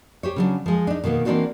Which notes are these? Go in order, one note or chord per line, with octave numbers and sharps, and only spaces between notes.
G4 C5 C#5
C#3 F#3 D4
F3 G#3
D4 D#4
B2 D#3 A#3 B3
E3 A#3 C4 D4 D#4 F#4